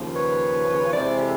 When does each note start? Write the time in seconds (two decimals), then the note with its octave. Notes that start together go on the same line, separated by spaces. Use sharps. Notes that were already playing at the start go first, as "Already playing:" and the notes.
Already playing: D#2 C#3 F3
0.14 B4 C#5
0.93 C3 E3 G#3 C4 C5 D5
1.19 G4 A4